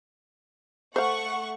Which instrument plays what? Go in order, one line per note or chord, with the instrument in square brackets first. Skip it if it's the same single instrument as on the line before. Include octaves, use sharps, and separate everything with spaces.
[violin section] A3 F#5 C#6 [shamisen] C5 F5